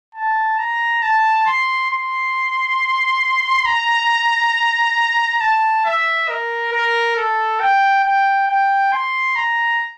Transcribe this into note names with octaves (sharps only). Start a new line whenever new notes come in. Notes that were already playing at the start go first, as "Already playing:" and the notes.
A5
A#5
A5
C6
C6
A#5
A5
E5
A#4
A#4
A4
G5
G5
G5
C6
A#5